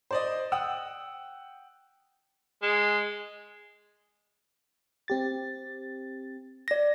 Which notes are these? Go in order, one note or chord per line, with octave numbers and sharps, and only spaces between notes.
C5 D5 D#5
F#5 G5 D#6 E6
G#3
C4 G4 A6
D5 A#6